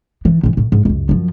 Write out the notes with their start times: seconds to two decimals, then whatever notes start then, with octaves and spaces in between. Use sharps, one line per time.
0.25 E3
0.43 G#2 E3
0.57 A2
0.72 G#2
0.85 C#2 F#2
1.09 F#2 F3